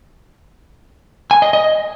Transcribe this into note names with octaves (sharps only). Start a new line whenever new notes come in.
G#5
D#5
D#5